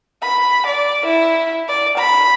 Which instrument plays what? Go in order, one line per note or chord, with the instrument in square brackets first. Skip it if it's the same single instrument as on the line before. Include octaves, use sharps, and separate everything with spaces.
[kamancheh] B5
D5
E4
D5
B5